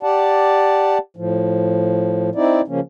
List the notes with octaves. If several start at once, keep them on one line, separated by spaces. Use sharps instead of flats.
G4 D5 F#5 A5
A2 F3
C4 D#4 E4 D5
C#3 F3 A#3 C#4